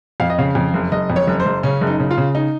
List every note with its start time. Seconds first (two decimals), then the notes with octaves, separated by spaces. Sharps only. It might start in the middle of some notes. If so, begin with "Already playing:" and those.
0.20 F2 F5
0.30 D#5
0.38 C#3 F5
0.55 F2
0.74 F#1
0.92 F#1 D#5
1.10 F2
1.16 C#5
1.27 F#1
1.40 C5
1.45 F#1
1.63 C#3 C#4
1.81 F#1
1.87 D#4
2.00 C#3
2.11 F4
2.18 C#3
2.35 D#4